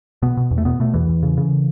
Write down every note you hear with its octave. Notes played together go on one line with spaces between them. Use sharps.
B2 B3
B2
E2
A3
B2 B3
B2 A3
E2 E3
E2
C#3
C#3